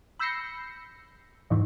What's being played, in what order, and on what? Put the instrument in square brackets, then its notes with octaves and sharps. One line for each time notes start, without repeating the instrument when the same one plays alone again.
[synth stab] B5 E6 G6 A#6 C7 C#7
F2 G#2 D#3 E3